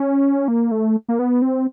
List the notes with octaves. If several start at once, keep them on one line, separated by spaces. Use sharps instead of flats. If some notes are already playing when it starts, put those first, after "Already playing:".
Already playing: C#4
A#3
A3
A#3
B3
C4